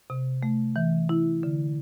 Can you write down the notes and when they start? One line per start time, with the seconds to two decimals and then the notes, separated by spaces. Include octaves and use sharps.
0.10 C3
0.43 A3
0.76 E3
1.09 E4
1.43 D3